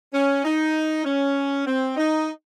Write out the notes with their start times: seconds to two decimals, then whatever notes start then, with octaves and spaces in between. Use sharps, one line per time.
0.14 C#4
0.44 D#4
1.05 C#4
1.66 C4
1.97 D#4